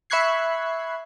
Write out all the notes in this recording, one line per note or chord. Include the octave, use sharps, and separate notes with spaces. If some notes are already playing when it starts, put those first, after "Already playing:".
E5 B5 C#6 F#6 G#6 C7